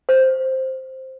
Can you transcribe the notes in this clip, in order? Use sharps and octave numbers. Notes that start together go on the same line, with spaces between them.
C5